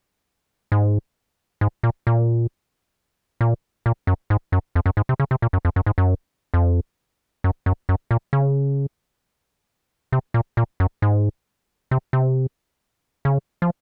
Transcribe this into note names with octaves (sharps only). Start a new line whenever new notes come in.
G#2
G#2
A#2
A#2
A#2
A#2
F#2
G#2
F#2
F2
F#2
G#2
C3
C#3
C3
A#2
F#2
F2
F#2
G#2
F#2
F2
F#2
F#2
F#2
A#2
C#3
C3
A#2
A#2
F#2
G#2
C3
C3
C#3
F3